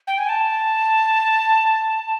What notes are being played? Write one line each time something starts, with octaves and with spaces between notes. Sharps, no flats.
G5
G#5
A5